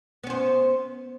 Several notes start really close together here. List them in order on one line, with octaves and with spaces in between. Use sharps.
B3 C#4 C5